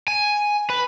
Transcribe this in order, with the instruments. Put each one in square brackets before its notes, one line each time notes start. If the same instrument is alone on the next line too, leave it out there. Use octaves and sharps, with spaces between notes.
[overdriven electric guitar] G#5
B4